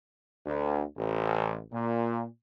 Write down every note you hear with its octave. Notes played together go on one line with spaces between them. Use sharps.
D2
A1
A#2